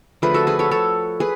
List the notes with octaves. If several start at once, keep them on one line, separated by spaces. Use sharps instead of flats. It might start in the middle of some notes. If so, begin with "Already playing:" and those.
D3 F3 A3 G#4 B4
F#4 A4
G#4 B4
A4 C#5
A4 C#5
G#4 B4